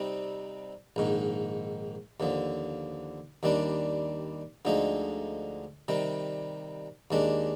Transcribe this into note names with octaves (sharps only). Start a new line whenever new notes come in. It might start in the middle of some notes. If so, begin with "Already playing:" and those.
Already playing: C3 G3 C4 D#4
A#1 G#2 D#3
D#2 D3 F3
D#2 D#3 G3 D4
D2 D3 F3 G#3 D#4
C3 D#3 G3
D#2 D#3 G#3 D4